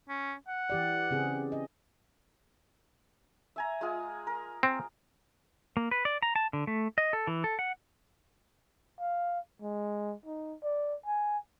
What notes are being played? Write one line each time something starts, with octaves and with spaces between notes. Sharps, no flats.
C#4
F#5
E3 G4 D5
C#3 C4 G#4
D#5
E5 G#5 A#5
G#3 F4 G#4
A#4
C4
A#3
B4
D5
A#5
A5
D3
A3
D#5
A4
E3
A4
F#5
F5
G#3
D#4
D5
G#5